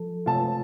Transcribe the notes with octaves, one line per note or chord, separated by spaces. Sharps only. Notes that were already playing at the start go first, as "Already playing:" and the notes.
Already playing: F3 A4
C3 A3 F4 A5